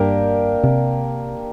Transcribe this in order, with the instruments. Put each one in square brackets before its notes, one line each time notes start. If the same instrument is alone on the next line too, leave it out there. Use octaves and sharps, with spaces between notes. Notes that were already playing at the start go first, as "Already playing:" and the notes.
Already playing: [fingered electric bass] G2 [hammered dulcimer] A#3 D4 G4 A#4
[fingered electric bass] C3